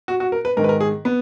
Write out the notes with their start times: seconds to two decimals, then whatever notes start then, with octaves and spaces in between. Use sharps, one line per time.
0.08 F#4
0.20 F#4
0.32 A#4
0.45 B4
0.57 G#2 D#3 A#4
0.64 B4
0.69 A#4
0.81 G#4
1.05 B3